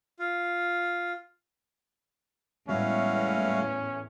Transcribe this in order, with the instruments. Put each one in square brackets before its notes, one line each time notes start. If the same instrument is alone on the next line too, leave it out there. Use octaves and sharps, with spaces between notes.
[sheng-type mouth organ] F4
[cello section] E2 A2 [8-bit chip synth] G3 G#3 [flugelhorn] C#4 [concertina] E4 F#4 F5